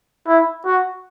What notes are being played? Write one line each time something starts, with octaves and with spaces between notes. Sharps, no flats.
E4
F#4